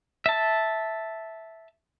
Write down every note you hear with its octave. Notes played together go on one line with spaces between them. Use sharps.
E5 A5